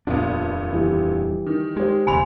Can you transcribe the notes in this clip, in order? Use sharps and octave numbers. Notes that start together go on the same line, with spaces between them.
D#1 F2 A#2 B3 D4
E3 G3
D#3
G#3 G4 C5
E1 D#2 C#3 G#5 B5 C6